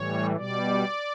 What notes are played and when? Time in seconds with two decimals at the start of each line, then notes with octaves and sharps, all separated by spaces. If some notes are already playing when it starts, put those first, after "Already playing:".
Already playing: A2 E3 G3 C#5
0.36 B2 G3 D5